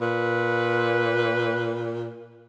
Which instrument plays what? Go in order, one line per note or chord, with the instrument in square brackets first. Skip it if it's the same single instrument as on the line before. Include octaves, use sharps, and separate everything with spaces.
[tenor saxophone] A#2 [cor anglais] B4